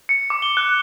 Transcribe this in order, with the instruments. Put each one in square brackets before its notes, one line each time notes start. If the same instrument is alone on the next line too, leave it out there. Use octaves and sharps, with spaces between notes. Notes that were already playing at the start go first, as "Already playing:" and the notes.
[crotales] C#7
D6
G7
F#6